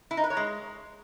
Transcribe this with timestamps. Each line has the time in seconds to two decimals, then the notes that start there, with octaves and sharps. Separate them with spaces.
0.11 E4
0.17 D#4
0.24 B4
0.30 C#5
0.37 G#3